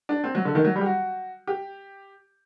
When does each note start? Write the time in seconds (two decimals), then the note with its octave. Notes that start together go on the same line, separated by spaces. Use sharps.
0.09 D4
0.24 C4
0.35 F#3
0.45 D3
0.55 D#3
0.65 F#3
0.76 G3
0.81 G4
0.86 F#4
1.47 G4